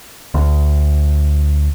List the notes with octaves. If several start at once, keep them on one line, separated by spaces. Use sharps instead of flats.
D2